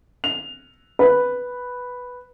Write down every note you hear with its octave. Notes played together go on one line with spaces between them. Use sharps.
F7
B4